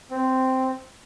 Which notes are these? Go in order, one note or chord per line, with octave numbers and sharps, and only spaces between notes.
C4